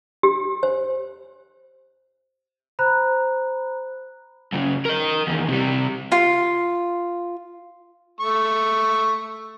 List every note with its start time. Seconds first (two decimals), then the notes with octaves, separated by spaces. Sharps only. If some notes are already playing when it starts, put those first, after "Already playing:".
0.23 G4
0.63 C5
2.79 C5 A#5 B5 F#6
4.52 F#2 C#3
4.86 A#4 D#5
5.27 E2 D#3
5.49 C3 G3
6.12 F4
8.20 A3 C#6